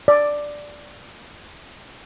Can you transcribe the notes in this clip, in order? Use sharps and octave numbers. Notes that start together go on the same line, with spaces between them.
D5